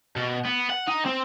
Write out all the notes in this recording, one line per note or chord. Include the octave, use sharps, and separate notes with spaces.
B2
B3
F#5
D#4
C4